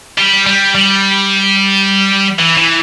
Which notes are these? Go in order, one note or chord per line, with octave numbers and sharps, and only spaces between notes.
G3
G3
G3
E3
E3